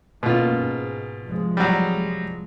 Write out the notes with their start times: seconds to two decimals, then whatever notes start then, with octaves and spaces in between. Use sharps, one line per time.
0.23 B2 A3 A#3 C#4 F4
0.53 G#2
1.23 C2 F3 G#3
1.57 F#3 G3